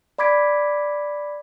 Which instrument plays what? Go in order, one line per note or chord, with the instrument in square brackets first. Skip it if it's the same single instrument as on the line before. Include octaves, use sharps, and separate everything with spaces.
[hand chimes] D5 B5 D6 G#6 B6 D7